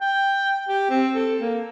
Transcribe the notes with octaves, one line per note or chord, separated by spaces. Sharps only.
G5
G4
C4
A4
A#3